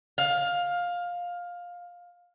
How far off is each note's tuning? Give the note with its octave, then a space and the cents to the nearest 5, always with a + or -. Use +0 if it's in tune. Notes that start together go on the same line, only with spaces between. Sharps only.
F5 +15